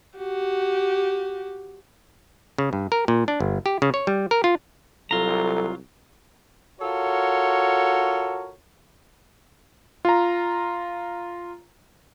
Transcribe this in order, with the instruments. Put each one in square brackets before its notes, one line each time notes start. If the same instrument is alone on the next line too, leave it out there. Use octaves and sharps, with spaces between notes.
[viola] F#4 G4
[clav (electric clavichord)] C#3
G2
A#4
A#2
D4
G1
G4
C#3
C#5
G3
A#4
F4
[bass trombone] C2 [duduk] F#3 [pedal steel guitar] F4 A#5 [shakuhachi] A4
[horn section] F4 F#4 A4 A#4 C#5
[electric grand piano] F4 A#5